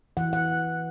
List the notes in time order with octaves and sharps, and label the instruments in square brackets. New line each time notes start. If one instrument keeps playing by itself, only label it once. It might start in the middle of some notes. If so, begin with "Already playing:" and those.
[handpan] E3 F#5
F#5